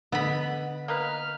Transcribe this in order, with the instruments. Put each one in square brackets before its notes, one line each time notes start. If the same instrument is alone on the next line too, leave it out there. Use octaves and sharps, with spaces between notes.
[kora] D3 [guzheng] B3 B5 [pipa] D#5
[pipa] A#3 D#4 B4 [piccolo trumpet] F6